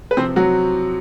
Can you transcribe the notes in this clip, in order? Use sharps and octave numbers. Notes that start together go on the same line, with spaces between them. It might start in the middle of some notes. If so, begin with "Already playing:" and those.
B4
C3 F3 C4 C5
F#3 F#4